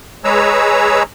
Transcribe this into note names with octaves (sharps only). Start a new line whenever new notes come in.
G#3 G#4 B4 C#5 A#5 E6